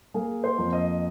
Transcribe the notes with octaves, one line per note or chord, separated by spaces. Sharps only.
A#3 G#4
C5
F2
D#5